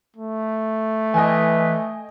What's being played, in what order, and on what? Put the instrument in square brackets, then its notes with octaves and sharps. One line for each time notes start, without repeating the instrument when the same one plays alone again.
[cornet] A3
[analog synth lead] E3 [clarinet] B4 [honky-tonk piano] D#5 G5 G#5